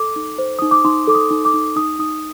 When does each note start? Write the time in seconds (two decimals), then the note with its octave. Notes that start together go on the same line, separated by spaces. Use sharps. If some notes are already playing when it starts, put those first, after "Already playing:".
Already playing: A4 D6
0.16 D#4
0.38 C5
0.59 D#4 D#6
0.71 D6
0.85 D#4 C6
1.07 A4 D6
1.15 D#6
1.30 D#4
1.45 D6
1.54 D#4
1.76 D#4 D#6
1.99 D#4 D#6